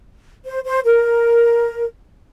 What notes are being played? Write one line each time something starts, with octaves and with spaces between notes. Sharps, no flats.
C5
C5
A#4